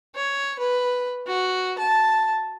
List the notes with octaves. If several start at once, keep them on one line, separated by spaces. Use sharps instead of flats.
C#5
B4
F#4
A5